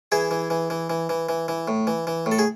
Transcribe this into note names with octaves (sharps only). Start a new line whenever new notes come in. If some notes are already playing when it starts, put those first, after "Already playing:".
E3 E4 G#4
E3
E3
E3
E3
E3
E3
E3
A2
E3
E3
A2
A4
G#4